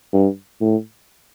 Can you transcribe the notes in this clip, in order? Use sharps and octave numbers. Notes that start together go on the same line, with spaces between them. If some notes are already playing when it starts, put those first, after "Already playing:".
G2
A2